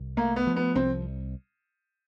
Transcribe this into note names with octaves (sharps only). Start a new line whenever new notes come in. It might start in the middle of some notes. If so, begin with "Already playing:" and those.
Already playing: C2
A3 A#3
B3
F3
B3
C2 C4